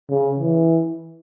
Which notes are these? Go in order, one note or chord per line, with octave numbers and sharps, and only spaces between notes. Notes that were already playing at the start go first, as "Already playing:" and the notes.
C#3
E3